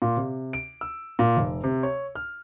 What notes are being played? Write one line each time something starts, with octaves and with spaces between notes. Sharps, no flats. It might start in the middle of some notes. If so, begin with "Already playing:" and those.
A#2
C3
D7
E6
A#2
F1
C3
C#5
F6